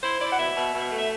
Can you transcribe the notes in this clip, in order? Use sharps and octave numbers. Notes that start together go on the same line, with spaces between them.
E4 C5
E4 D5
F#5
B2 E5
B2
B2
A3
E5